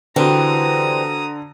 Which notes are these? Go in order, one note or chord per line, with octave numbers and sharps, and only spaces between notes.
D3 E3 G3 C4 F#4 C5 A#5 D#6